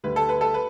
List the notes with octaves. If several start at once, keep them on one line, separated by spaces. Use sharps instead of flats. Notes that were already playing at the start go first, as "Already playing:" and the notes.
D2 D3 G3 B4
A4
B4
A4
B4